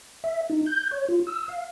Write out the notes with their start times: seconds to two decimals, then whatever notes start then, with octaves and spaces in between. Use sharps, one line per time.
0.24 E5
0.50 D#4
0.66 G6
0.91 C#5
1.09 F4
1.27 E6
1.48 F5